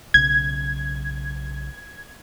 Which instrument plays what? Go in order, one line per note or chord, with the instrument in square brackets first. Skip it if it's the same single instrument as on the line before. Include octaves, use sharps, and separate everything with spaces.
[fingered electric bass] B1 C#3 [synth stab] G#6